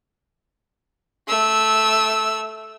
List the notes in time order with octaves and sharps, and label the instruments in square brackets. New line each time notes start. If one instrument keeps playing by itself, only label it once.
[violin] A3 E6